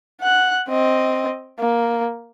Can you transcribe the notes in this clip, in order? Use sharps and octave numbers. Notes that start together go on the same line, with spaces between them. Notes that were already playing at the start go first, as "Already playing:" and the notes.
F#5 F#6
C4 D#5
A#3